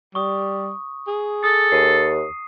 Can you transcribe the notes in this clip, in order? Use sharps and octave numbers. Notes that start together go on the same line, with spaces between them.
G3 C#6 D#6
G#4
A4 D#6
D#2 C7 D#7